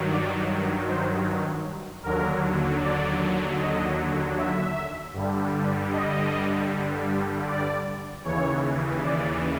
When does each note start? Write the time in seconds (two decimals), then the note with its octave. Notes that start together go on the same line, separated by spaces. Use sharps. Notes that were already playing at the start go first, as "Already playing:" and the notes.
Already playing: G2 D#3 F#3
0.10 D5
0.87 C5
2.03 D#2 D3 F#3 A#4
2.81 D5
3.59 D#5
4.36 E5
5.13 G2 D3 G3
5.92 D#5
7.46 D5
8.24 D#2 C#3 E3 C#5
9.03 D5